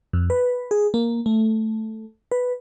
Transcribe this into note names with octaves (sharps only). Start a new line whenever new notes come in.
F2
B4
G#4
A#3
A3
B4